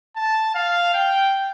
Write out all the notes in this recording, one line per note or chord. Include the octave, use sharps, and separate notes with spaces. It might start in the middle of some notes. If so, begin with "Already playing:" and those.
A5
F5
G5